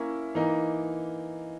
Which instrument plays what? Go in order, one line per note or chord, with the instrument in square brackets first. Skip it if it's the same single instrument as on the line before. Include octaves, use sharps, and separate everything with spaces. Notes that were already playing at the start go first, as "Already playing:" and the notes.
Already playing: [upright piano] A#3 C#4 E4
E3 A#3 D#4